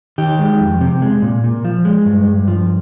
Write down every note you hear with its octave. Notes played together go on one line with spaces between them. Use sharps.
D#3 G4
G#3
F2
C3
G#3
A#2
A#2
F3
G#3
G2
G2
F3